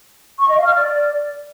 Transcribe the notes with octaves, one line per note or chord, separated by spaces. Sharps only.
C#6
D#5
F5
F6
D5